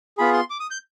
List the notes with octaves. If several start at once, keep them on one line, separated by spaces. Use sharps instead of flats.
B3 F4 G#4 B5
C6
D6
D#6
G6